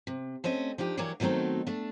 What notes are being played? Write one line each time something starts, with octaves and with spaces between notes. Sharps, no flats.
C3
A3 C4 C#4 D#5
F3 D4 D#4 G4
E3 F#3 A#3 G4 C#5 D5
B2 D#3 F#3 A3 C4 D#4
A3 D4